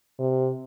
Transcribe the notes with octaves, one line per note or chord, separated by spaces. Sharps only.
C3